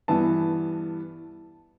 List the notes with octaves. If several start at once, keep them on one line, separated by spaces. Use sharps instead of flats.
G2 E3 B3 A5